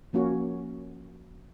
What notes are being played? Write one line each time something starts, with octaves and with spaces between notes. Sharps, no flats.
F3 A#3 C#4 F#4